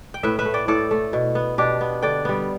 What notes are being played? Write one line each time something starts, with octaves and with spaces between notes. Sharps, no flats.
G5
A2 B4 E5
B4 E5
A3
D5 G5
A2 A4 D5
A3
B2
B3
B2 D4 G4
B3
D3 D5 G5
G3 B3